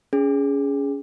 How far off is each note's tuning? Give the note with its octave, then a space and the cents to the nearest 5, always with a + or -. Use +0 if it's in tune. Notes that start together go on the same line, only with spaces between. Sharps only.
C#4 +25 G#4 +0